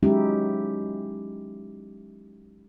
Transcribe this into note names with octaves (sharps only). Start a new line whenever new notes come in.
F#3 G#3 C#4 D#4 E4 G4